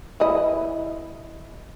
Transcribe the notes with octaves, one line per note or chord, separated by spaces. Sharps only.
E3 E4 D#5